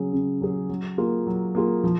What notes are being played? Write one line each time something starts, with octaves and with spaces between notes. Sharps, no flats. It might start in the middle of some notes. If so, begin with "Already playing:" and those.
Already playing: C#3 F#3 C#4 G#4
C#3
F#3 C#4 G#4
F#3
A#3 F4 G#4
F#3
A#3 F4 G#4
F3